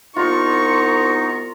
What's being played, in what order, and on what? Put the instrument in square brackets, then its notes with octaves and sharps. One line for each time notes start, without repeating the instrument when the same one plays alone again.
[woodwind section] C2 B3 A#5 [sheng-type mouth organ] D#4 [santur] F4 [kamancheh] C#6